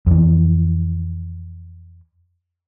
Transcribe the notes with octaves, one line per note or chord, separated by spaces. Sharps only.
F2 E3